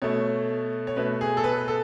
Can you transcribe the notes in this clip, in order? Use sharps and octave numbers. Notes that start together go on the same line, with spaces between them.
B2 A3 C#5
C#5
B2 A3 B4
G#4
A4
B4
A4